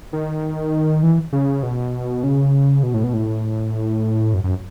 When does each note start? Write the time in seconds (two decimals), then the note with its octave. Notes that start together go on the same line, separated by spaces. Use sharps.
0.13 D#3
1.03 E3
1.32 C#3
1.63 B2
2.23 C#3
2.83 B2
2.94 A2
3.04 B2
3.14 A2
4.34 F#2
4.44 F#2